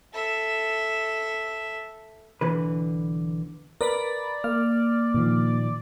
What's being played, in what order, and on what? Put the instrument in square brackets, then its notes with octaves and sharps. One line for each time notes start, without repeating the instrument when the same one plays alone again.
[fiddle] A4 E5
[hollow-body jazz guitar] B1 D3 E3 B4
[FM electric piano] A#4 B4 B5 [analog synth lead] D5
[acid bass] A#3 [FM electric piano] F6
[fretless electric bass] A#2 D#3 F3